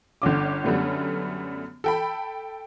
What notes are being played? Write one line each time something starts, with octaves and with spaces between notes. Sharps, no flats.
G1 D3 C#4 D6
F#2 D3 G3 A3 B3 C#4
A4 G5 B5